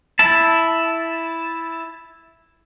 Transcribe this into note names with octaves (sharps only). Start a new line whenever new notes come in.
E4 A5